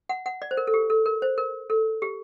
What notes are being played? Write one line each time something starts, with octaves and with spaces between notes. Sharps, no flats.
F#5
F#5
D5
C5
A#4
A4
G4
A4
A#4
C5
A#4
A4
G4